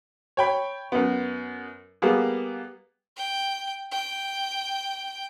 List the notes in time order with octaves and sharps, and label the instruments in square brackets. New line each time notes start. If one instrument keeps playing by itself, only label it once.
[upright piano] C#5 G5 B5
F#2 B3
G3 A#3 B3 G#4
[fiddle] G5
G5